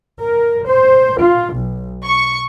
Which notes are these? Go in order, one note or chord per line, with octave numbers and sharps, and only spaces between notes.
A#4
C5
F4
B1
C#6